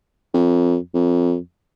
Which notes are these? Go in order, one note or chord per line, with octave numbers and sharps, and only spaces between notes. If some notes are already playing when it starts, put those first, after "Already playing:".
F2
F2